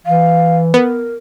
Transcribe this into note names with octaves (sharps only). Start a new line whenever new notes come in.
E3 F5
B3 A#4